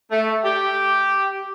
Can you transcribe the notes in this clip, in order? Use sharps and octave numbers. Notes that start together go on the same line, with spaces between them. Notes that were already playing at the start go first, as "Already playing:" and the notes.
A3
G4